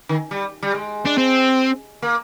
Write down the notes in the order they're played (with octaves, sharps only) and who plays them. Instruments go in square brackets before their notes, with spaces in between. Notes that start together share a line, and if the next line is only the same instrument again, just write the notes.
[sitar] D#3
G3
G3
G#3
[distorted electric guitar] D4
C4
[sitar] A#3